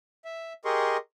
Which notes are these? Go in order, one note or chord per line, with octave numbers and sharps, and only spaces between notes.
E5
G4 G#4 A#4 D#5 C6 C#6